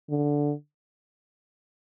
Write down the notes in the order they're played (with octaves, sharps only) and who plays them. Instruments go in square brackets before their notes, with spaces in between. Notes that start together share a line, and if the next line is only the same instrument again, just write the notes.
[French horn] D3